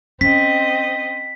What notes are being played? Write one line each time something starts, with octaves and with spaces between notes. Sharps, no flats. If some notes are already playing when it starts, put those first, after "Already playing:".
C4 C#4 D#5 B6